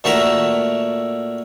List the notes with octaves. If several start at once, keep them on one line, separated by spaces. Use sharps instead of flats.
A#2 A3 F#4 A#4 E5 A#5